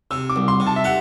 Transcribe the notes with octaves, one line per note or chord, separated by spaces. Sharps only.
C3 E6
D6
C2
C6
C3
A5
E5
G4 F#5